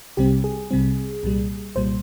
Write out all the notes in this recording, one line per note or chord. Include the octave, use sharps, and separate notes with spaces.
C2 C3 G3 C4 G4
G#4
C2 C3 G3 C4
C2 A#2 G3
C2 A#2 G3 C5